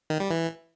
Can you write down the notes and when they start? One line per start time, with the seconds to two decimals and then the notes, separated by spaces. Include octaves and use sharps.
0.10 D#3
0.20 G3
0.31 E3